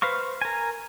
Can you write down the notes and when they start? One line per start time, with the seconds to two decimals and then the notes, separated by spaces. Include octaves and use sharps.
0.02 B4 C5 F5 C#6
0.42 A#4 G#5